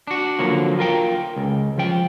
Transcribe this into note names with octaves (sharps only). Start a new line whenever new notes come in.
D4 F#4
D3 F3 F#3 A#3
F4 A#4 G5
C#2
F3 G5